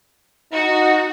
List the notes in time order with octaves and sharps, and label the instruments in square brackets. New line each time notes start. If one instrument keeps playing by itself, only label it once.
[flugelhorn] D#4 [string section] F#4